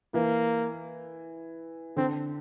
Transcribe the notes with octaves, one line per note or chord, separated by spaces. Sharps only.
E3 A#3
D3 C4